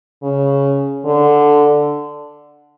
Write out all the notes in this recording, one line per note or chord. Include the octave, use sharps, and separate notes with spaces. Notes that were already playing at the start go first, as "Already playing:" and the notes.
C#3
D3